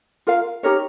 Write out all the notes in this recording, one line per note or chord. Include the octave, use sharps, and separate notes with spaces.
F4 A#4 F5
D#4 G4 A#4 C#5